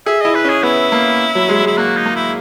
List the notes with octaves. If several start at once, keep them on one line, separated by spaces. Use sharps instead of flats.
G#4 E5
E4 D#5
B4
C#4 G#4
B3 E4
A#3
F#3
G#3
G#3 E4
A#3 F#4
D#4
A#3
E4